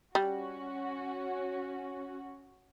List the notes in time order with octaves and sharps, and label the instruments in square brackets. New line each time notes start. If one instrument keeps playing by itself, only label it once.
[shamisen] G3 [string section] C#4 F#4